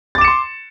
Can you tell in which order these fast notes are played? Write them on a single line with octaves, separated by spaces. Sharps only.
A6 D6 E7 C#7 C6